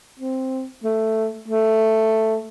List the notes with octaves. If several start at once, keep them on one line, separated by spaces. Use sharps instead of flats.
C4
A3
A3